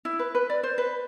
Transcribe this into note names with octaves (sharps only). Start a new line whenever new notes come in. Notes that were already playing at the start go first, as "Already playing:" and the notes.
E4
B4
B4
D5
C5
B4